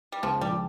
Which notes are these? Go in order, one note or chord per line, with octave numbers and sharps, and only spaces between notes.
G3
C#2 F3
F3 G3